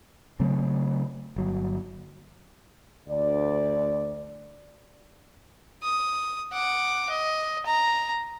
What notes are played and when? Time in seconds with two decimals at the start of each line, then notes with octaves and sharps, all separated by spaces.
0.40 C#3 F#3 A3 C4
1.36 G1 F#3
3.07 D2 D5
5.83 D#6
6.53 F#5 D6
7.10 D#5
7.66 A#5